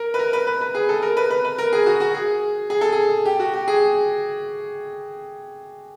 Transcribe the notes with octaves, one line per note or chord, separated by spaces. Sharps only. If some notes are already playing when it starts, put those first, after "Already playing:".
Already playing: A#4
B4
A#4
B4
B4
B4
G#4
A4
A#4
B4
B4
B4
A#4
G#4
F#4
F#4
G#4
G#4
A4
G#4
G4
F#4
G4
G#4